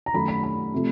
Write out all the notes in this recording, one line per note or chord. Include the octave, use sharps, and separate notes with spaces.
A#5
F#2 D#3 F#3 A3 B5
B5
B5
C3 F3 A3